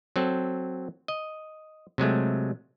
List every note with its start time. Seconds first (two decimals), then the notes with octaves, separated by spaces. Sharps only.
0.16 F#3 C4 A4
1.08 D#5
1.98 C3 F#3 G#3 A3